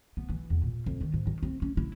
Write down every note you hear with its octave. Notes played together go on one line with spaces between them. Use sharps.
B3
E3
E2
A#2
F2
D#3
G#2
D#3
C4
C#4
E4